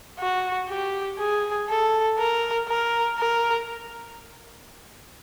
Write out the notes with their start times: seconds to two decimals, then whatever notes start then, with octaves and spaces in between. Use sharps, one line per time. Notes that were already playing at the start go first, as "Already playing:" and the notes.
0.19 F#4
0.69 G4
1.19 G#4
1.68 A4
2.18 A#4
2.68 A#4
3.18 A#4